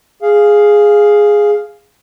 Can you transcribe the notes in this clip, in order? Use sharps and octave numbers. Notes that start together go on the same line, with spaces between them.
G#4 F5